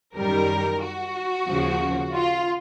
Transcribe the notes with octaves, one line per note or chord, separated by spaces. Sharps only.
F#2 D#3 G3 A#4
F#4
D#2 C#3 F3
F4